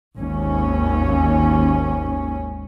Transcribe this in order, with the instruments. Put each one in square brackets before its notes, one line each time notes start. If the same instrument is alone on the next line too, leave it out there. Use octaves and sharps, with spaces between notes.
[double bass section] G#1 D#2 C#4